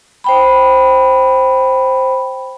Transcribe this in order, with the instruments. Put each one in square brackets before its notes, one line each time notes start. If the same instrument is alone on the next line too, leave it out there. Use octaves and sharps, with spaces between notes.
[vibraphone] C5 G5 B5